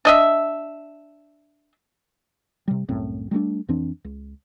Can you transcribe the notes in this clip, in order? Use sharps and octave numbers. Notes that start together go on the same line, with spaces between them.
D4 D#5 E5
C3 G3
C2 F#2 A2 C4
G3 A3 B3 D4
F2 E3 C4 D4
C#2